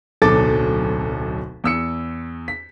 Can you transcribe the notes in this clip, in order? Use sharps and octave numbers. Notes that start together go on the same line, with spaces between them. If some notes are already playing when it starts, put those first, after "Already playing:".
D1 B1 A4 D6 A6
E2 E6 C#7
B6